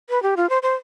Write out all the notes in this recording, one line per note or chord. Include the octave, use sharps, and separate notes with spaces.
B4
G4
F4
C5
C5